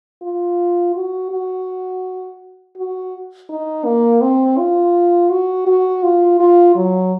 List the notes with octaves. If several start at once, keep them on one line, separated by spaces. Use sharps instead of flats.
F4
F#4
F#4
F#4
D#4
A#3
C4
F4
F#4
F#4
F4
F4
F#3